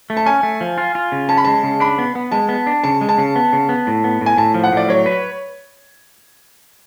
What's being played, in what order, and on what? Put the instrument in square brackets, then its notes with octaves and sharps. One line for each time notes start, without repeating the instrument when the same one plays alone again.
[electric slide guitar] A3
[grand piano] A5
[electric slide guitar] C#4 [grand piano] G#5
[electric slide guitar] A3
F3
F4
F4
C#3
[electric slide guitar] C#4 [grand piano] A5
[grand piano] B5
[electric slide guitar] G#3 [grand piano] A5
[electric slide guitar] C#3
[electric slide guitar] D4 [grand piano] B5
[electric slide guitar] B3
B3
[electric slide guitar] G#3 [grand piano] A5
[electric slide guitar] B3
D4
[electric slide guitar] C#3 [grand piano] A5
[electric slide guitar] G#3
[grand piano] A5
[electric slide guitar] C#3
B3
C#3
B3
A2
B3
A2
[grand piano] G#5
[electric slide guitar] A2 [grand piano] A5
[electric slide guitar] F3
[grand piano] F#5
[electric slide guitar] A2 [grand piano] D5
[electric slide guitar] F#3 [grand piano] C#5
[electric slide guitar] B4